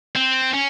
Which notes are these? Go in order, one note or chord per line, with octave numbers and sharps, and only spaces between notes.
C4
C#4